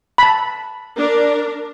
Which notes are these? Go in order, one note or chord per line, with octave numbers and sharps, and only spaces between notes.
A5 B5
D4 A#4